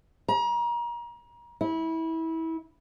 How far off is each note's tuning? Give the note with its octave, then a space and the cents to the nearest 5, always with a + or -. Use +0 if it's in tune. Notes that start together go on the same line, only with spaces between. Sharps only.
A#5 +35
E4 -25